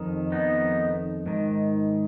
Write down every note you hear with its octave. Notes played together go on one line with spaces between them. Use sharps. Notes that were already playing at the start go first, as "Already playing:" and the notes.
Already playing: F2 D#3
B3 D#4
G#2 D#3